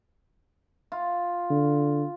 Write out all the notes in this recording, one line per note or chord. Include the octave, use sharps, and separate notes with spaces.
F4
D3